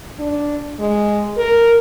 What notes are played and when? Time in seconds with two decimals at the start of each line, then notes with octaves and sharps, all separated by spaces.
0.19 D4
0.80 G#3
1.37 A#4